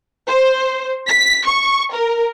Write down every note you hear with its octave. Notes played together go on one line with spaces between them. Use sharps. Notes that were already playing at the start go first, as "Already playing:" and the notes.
C5
B6
C#6
A#4